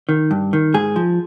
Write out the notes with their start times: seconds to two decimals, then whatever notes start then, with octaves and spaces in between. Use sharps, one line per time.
0.09 D#3
0.31 G2
0.53 D#3
0.74 G#2 G#4
0.96 F3